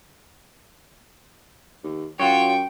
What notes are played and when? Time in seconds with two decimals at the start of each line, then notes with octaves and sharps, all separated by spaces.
1.83 D#2
2.20 F#2 F4 F#4 C#5 G5 C#6